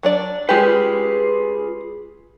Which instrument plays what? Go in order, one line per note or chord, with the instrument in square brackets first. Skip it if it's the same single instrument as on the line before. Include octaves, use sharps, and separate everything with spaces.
[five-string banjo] F#3 D4 D5
[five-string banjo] G#3 G4 [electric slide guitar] F4 G#4 B4